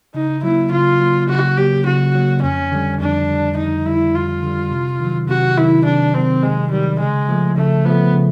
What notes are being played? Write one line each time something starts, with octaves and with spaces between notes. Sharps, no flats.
C#3 D#4
F#3 A#3 E4
C#3 F4
F#3 A#3
C#3 F#4
F#3 A#3 G4
C#3 F#4
F#3 A#3
F2 C#4
D3 G3
F2 D4
D3 G3
F2 D#4
D3 G3 E4
F2 F4
D3 G3
C3
D#3 F#3
C3 F#4
D#3 F#3 E4
C3 D4
D#3 F#3 C4
C3 G#3
D#3 F#3 G3
C#3 G#3
F3 A3
C#3 A3
F3 A3 B3
C#3